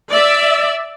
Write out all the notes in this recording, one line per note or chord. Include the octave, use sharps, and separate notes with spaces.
D5 E5